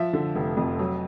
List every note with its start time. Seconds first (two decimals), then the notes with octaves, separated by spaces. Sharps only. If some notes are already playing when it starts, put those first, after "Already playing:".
Already playing: F3 E5
0.13 D3
0.35 F1
0.57 F2
0.79 F#3